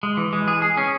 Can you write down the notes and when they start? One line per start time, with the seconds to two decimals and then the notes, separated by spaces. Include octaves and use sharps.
0.03 G#3
0.17 E3
0.33 G#3
0.48 G#4
0.62 G#4
0.77 C#4